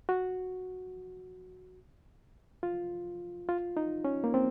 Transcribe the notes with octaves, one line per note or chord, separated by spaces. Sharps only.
F#4
F4
F4
D#4
C#4
A#3
C4